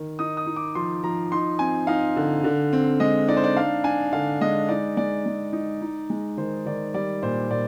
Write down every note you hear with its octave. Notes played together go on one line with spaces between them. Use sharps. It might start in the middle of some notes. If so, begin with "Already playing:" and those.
Already playing: D#3
D#4 D#6
D#6
D#4
D6
F3 C6
F3 A#5
D#4 C6
C4 G#5
D#4 F5
D3
D3
C4
G#3 D#5
D#4 D5
C5
D5
D4 F5
D4 G#5
D3 F5
G#3 D#5
D#4 D5
G#3 D5
G#3
D#4
D#4
G#3
D#3 C5
D#3 D5
G3 D5
A#2 C5
A#2 D5